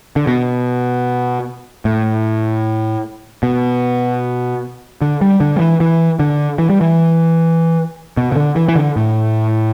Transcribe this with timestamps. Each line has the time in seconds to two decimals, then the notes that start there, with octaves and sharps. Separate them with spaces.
0.16 D3
0.27 B2
1.85 A2
3.43 B2
5.01 D3
5.21 G3
5.40 D3
5.56 G3
5.60 E3
5.80 E3
6.20 D3
6.58 E3
6.70 G3
6.81 E3
8.17 B2
8.32 B2
8.36 D3
8.56 E3
8.68 E3
8.76 D3
8.96 A2